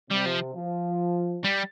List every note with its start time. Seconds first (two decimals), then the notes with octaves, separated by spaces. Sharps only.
0.10 C3 G3
0.26 F3
0.55 F3
1.44 G3